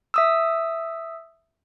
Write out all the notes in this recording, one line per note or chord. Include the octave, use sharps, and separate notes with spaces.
E5 D#6 E6